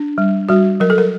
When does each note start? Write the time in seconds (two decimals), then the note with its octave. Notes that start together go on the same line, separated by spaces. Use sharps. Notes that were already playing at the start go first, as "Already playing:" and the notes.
Already playing: D4
0.18 G3
0.49 G3 F#4
0.80 F#3 A#4
0.90 A4
0.98 A#4